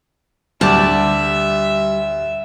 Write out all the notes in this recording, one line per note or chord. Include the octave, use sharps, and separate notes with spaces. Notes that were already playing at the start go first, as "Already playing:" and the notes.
D2 G3 D5 E5 A5